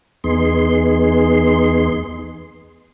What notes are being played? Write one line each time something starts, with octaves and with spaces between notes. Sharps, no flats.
E2 B3 D#4 G#4 C6